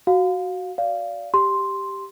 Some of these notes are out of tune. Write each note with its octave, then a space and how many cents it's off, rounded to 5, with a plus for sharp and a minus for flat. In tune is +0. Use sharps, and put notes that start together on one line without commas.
F#4 +5 F5 +25
D5 -20 F5 -10
G4 +0 C6 +0